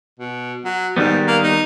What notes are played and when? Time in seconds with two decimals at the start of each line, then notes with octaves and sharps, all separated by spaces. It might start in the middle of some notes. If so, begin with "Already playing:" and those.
0.19 B2
0.65 F#3
0.97 G#2 D#3 G3 B3
1.27 A#3
1.43 D#4